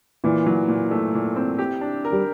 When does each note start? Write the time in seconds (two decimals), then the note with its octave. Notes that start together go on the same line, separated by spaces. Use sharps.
0.24 A#2 E3
0.46 F#3
0.68 A#2
0.91 A3
1.14 A#2
1.36 C4
1.59 G4
1.81 D4
2.05 A#4
2.12 G3